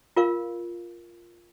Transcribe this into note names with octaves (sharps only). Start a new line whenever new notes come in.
F4 A#4 F5